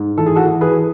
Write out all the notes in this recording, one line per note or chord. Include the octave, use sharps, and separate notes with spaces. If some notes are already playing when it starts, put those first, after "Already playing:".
Already playing: G#2
E3 A4
G#4
F#4 A4
E3
G#4 B4